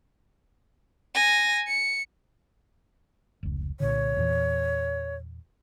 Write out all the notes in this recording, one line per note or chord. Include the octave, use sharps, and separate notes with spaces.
G#5 A#6
C#7
F1 C#2
C2 A#2 D3 C#5
E2 A#2 E3